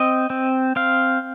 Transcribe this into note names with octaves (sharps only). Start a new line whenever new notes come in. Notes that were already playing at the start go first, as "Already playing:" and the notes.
Already playing: C4 D#5
C4
C4 F5